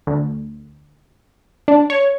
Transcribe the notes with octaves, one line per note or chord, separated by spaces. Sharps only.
D2
D4
C#5